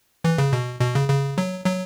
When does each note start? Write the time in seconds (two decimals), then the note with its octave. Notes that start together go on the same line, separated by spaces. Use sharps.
0.24 E3
0.38 C#3
0.53 B2
0.81 B2
0.95 C#3
1.09 C#3
1.38 F#3
1.66 F#3